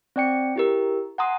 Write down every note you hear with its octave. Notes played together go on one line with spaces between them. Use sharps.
C4 D5 G5 C#7
E4 G4 A#4
F#5 G#5 A#5 C6 D#6